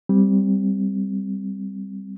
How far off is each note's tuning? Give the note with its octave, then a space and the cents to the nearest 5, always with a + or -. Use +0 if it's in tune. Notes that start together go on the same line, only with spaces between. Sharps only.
G3 +0 C4 +0